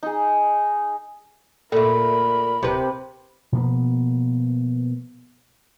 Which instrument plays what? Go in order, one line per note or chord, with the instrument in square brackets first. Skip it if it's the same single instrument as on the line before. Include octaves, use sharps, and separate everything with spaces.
[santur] D#4 G#4
[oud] A#2 A3 [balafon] A4 [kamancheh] A#4 B5
[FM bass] D1 [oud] C3 B4
[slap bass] B2 F3 A#3 B3